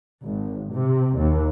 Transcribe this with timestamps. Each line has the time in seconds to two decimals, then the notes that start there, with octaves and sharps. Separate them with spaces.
0.23 G#1
0.73 C3
1.16 D#2